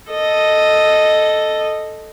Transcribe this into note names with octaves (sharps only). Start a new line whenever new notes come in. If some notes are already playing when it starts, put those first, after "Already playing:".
A4 D#5